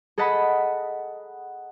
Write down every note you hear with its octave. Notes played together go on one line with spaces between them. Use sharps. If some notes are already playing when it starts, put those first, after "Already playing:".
G#4 A4 D#5 F#5 A5 B5